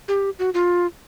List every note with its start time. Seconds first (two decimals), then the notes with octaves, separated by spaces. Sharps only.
0.08 G4
0.39 F#4
0.54 F4